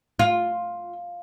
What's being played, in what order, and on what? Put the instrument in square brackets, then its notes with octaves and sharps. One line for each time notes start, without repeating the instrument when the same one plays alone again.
[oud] F4